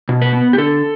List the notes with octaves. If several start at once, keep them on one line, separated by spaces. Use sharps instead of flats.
B2
B4
B3
G4
D3 A4